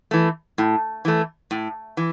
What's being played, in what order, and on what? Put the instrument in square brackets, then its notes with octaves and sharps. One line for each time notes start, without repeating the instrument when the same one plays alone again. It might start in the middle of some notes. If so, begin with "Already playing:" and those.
[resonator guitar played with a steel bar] E3 A3
A2
E3 A3
A2
E3